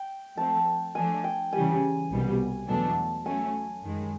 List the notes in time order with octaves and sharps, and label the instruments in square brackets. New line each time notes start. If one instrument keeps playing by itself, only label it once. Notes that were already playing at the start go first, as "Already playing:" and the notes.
Already playing: [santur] G5
[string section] F3 A3 C4 [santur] A5
[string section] F3 A3 D4 [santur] G#5
[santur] G5
[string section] C#3 E3 G3 [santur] G#5
[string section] C2 B2 G3
[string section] E2 B2 F#3 A3 D4 [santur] A5
[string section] F#3 A3 C#4 [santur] G#5
[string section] F#2 D#3 G#3